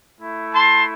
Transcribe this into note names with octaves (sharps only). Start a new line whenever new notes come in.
A3 E4
A5 C6